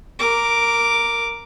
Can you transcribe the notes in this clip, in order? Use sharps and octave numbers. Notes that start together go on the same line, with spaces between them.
A#4 D6